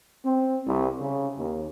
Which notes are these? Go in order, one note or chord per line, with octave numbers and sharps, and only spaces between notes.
C4
C2
C#3
D#2